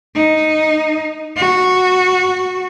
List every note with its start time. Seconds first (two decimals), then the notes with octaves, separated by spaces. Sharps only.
0.16 D#4
1.37 F#4